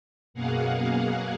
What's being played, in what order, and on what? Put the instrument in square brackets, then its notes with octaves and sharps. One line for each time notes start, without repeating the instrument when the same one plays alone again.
[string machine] F#2 B2 A#3 G#4 F5 F#5